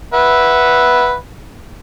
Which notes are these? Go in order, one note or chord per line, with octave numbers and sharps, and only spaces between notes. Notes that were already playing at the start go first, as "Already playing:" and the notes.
B4 E5 F#5